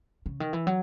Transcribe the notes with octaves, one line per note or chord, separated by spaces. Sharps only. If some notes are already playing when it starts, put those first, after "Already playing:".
C#3
D#3
E3
F#3